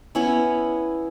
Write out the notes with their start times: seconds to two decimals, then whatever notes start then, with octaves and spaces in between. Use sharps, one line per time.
0.15 B3 C#4 E4